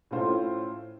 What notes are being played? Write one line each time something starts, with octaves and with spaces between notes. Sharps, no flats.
A2 A3 C#4 F4 C5